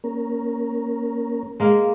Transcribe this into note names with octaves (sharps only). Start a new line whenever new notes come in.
A#3 C#4 A#4
G#3 A#3